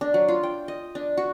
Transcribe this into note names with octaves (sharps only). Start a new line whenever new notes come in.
D4
F#3
F4
G5
D#5
D4
F#4